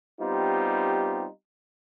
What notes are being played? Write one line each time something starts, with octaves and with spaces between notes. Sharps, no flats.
G3 B3 C4 D#4 F4 G4